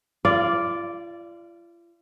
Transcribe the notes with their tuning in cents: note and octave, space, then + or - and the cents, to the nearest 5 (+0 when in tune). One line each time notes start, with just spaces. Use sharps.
F4 -40 D5 -5 F5 +0